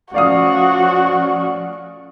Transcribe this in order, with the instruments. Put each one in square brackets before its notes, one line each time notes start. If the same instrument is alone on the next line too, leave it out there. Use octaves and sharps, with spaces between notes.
[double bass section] F3 A3 C#4 [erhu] F#4 [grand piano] D5 F5 D#6